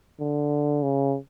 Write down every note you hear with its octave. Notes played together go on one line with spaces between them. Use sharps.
D3
C#3